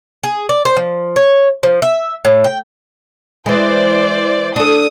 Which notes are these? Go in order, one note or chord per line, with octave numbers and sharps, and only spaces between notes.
G#4
D5
C5
F3
C#5
F3
E5
A2
G5
E3 G#3 C5 D5
D4 A4 D#6